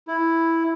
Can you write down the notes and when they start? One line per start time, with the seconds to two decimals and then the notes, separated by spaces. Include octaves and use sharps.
0.08 E4